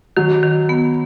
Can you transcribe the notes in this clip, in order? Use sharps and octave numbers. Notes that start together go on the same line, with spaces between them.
D#3 F#3
D#3
B3